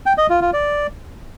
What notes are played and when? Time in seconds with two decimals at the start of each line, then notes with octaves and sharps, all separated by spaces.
0.06 G5
0.18 D#5
0.30 F4
0.41 F4
0.53 D5